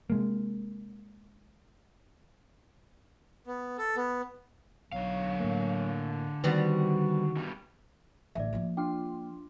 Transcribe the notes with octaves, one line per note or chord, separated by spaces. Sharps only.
C3 G#3 A#3
B3
A4
B3
B1 D3 F#3 F5
A2 A#3
D#3 G3 B3 C4 F#4
G2 B2 G3
A1 D3 D5 E5
F3 A#3
D4 F4 G5 C6